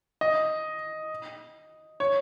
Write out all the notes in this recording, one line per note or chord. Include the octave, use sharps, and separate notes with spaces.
D#5
C#5